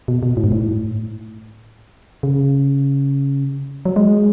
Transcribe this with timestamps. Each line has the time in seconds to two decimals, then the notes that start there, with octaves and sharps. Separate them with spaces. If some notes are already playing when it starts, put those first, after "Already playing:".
0.08 B2
0.23 B2
0.37 A2
0.44 G#2
0.52 A2
2.23 C#3
3.85 F#3
3.96 G#3